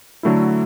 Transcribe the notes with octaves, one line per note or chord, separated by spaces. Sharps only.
D3 F#3 A3 E4